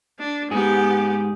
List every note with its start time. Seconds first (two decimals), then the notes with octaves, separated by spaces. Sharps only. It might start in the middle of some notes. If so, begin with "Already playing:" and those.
0.19 D4
0.51 G#2 B3 G4 G#4